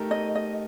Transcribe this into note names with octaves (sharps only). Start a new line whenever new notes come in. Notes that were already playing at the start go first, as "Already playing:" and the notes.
Already playing: A3 D#4 G4 A#4
D#5
D#5